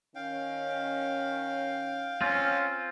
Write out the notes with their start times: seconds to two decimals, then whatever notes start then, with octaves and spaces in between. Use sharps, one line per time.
0.15 D#3 C#4 C#5 F5 G5
2.21 C4 C#4 F4